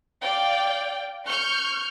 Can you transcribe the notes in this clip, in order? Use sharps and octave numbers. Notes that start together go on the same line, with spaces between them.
D5 F5 G5
C#6 F6 G6